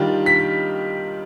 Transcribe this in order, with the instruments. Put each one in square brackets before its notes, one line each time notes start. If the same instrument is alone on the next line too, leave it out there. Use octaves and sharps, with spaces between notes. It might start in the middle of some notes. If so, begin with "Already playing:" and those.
Already playing: [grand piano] D#3 G3 D4 F4
B6